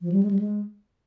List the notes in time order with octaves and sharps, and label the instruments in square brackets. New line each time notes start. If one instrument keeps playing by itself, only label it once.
[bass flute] F3
G3
G#3
G3
G#3